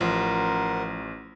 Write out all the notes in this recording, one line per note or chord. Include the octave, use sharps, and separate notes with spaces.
A1 F3 A#4 C5 F#5